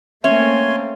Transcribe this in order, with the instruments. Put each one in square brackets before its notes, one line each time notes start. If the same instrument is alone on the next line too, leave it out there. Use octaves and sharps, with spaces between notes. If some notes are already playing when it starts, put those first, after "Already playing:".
[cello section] A3 A#3 C4 [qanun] C#4 [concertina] C#5 G#5 C6 [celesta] E5